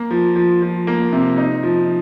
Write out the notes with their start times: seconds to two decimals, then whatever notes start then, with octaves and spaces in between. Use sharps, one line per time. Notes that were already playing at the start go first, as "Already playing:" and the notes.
Already playing: A#3
0.11 F3
0.36 F3
0.62 F3
0.87 A#3
1.12 C3
1.37 D#4
1.63 F3